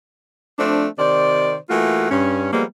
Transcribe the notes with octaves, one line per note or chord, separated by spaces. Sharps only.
F3 A3 C4 D4
C3 D#3 C5 D5
E3 A3 A#3 F4 F#4
G2 C#4
F3 G3 G#3 A#3 B3